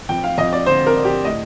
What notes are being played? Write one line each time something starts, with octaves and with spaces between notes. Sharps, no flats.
F2 G5
F5
F2 D#5
D5
D3 C5
A#4
D3
G4
A2 D#5